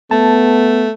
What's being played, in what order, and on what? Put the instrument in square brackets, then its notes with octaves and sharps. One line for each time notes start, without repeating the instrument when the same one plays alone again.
[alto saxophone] A3 [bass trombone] B3 [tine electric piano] A5